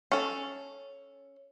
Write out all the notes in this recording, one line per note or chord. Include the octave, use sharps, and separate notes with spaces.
C#4 A4